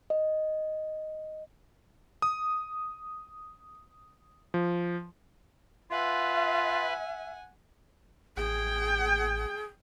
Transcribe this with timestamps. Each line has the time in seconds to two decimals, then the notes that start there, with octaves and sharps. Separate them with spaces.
0.10 D#5
2.22 D#6
4.54 F3
5.91 F4 B4 E5 F#5 G#5
8.37 A1 G#4 G5